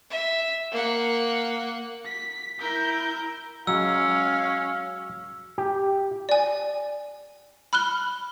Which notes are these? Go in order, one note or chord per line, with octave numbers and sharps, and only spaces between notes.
E5
A#3 F#5
B6
E4 A#4 G6
F#3 G#3 C#4 F5 E6
G4
D5 G#5
B5 F6 F#6 G7